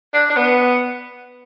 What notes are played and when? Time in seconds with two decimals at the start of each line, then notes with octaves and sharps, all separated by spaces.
0.14 D4
0.30 D4
0.36 B3